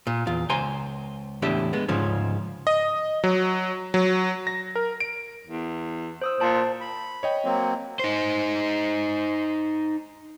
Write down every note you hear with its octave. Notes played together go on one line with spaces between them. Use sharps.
A#2
E2 F4
C#2 C5 G#5 A#5 C6
E2 A2 D4 G4 E5
G#3 B3
D2 G#2 C#3 F3 C#4
D#5
F#3
F#3
A#6
A#4
D7
E2
C5 D#6 E6
A#2 C5 A5
B5
C#5 D#5 G5
F#3 A#3 C4
D#4 C5